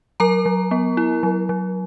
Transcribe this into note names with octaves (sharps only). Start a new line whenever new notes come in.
F#3 A#4 A#5
F#3
B3
E4
F#3
F#3